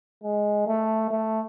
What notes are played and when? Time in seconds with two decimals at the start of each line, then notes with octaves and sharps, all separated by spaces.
0.24 G#3
0.67 A3
1.11 A3